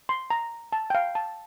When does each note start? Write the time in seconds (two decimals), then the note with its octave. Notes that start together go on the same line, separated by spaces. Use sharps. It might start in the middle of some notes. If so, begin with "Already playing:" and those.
0.09 C6
0.30 A#5
0.72 A5
0.90 G5
0.95 F5
1.15 A5